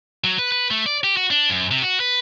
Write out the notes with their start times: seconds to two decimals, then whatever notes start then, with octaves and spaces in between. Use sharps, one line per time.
0.24 F#3
0.39 B4
0.52 B4
0.71 A3
0.86 D5
1.04 G4
1.17 F#4
1.31 D4
1.50 F#2
1.71 C3
1.82 F#4
2.00 B4